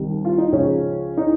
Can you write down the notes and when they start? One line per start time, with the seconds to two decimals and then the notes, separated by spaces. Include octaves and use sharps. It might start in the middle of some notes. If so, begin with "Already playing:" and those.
Already playing: C2 C3 D#3 G3
0.25 F4
0.38 D#4
0.52 C#2 C#3 F3 C#4
1.18 D#4